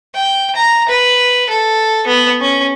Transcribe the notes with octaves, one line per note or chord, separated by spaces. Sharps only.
G5
A#5
B4
A4
B3
C#4